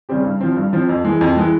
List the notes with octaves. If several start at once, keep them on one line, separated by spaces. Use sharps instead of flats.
C#3 G3 C4 G4
G2
F3 C4
G2
F3 C4
F2
E3 G#3
F2
E3 G#3